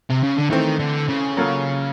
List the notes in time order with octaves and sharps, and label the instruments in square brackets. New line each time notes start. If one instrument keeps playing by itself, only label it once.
[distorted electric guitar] C3
C#3
D3
[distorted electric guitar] D#3 [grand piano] E3 A3 C4
[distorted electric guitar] D3
C#3
[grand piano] F#3 A#3 C#4 F4 A4